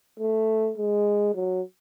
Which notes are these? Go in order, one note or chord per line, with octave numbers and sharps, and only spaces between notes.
A3
G#3
F#3